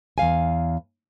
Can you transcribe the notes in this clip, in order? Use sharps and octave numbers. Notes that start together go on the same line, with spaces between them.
E2 G#3 F5 G#5